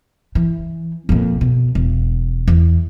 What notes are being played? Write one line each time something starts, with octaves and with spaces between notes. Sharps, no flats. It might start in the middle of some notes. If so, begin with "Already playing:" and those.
E3
F2 A#2
B2
E1
E2